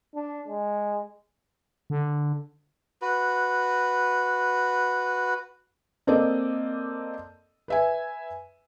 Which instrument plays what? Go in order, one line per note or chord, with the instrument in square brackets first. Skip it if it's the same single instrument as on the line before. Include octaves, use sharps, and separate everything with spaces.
[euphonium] D4
G#3
[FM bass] D3
[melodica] F#4 B4
[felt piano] A#3 C4 A4 D5 D#5
B4 E5 G#5